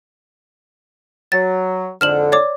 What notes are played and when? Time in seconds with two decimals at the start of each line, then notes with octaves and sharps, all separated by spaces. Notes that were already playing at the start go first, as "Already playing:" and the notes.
1.32 F#3 A6
2.01 F2 G#2 D3 F6 E7 F#7
2.32 C#5 D5 D6